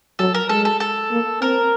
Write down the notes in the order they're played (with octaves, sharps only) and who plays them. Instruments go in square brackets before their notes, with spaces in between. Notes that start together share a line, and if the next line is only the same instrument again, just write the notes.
[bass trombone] F#3 [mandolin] A4
[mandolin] A#4
[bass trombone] G#3 [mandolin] A4
[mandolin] A4
A4
[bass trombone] A#3
[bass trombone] C4 [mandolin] A#4